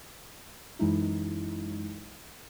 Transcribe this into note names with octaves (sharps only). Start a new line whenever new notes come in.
F#2 E3 G#3 D#4 E4